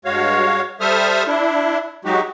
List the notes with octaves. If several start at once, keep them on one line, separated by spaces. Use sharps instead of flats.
G2 G#3 F#4 C#5 F5
G3 A4 C5 E5 D#6 F6
D4 E4
F#3 G#3 D#4 F#4 G4